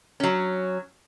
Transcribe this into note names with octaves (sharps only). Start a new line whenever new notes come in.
F#3 C#4